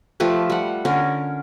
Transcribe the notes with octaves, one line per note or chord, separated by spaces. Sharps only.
F3 A3 G4 B4
G3 F#5
D3 C#4 A#4